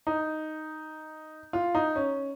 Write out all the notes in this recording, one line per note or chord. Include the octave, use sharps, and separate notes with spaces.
D#4
F4
D#4
C#4